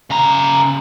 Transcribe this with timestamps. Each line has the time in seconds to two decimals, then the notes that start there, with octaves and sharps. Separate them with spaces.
0.10 C#3 A#5